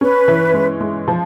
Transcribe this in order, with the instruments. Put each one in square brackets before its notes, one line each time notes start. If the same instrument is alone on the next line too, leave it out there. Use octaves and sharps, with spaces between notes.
[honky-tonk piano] C#4 [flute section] B4
[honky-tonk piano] E3
G#3
G#3
F3